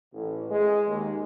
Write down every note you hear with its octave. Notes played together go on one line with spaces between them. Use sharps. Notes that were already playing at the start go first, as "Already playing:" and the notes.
A1
G#3
D#2